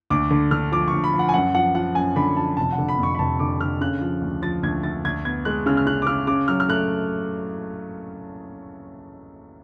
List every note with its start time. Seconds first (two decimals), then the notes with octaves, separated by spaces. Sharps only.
0.10 D2 D6
0.31 D3
0.51 D3 F6
0.72 F3 D6
0.88 C#6
0.93 D2
1.04 B5
1.13 F3
1.19 F#5
1.29 G#5
1.34 F#2 F#5
1.55 F3 F#5
1.75 F3 F#5
1.95 F#2 G#5
2.16 D3 B5
2.37 F3 A5
2.57 F1 A5
2.72 F#5
2.78 D3
2.89 B5
2.99 F2 C#6
3.15 B5
3.19 F1 A5
3.39 D3 D6
3.60 D3 F6
3.81 C#3 F#6
4.01 F3
4.21 D2
4.42 F3 A6
4.63 D2 G#6
4.83 D2 A6
5.05 D2 G#6
5.25 B3 G#6
5.45 G#3 F#6
5.66 C#3 F6
5.77 F6
5.86 C#3 F#6
6.02 D6
6.07 C#3 F6
6.27 C#3 D6
6.48 F#3 F6
6.60 F6
6.69 A3 F#6